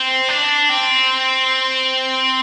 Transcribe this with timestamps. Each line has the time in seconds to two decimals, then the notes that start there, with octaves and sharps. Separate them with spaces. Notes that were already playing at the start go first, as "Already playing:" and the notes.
Already playing: C4
0.29 D4
0.69 C4